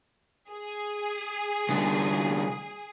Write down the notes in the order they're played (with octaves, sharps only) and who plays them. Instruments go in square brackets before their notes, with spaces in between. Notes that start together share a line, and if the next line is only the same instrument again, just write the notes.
[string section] G#4
[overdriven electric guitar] C2 D3